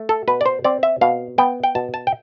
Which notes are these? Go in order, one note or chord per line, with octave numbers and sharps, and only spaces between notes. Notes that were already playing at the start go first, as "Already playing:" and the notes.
Already playing: A3
A4
B2 B4
D5
C5
C4 D5
E5
B2 F5
B3 G5
G5
B2 A5
A5
G5